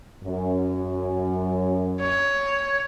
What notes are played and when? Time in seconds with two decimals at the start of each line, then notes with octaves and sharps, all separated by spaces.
0.24 F#2
2.01 C#5